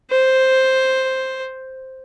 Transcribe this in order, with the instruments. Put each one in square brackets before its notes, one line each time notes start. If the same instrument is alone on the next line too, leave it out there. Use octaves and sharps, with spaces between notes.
[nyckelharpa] C5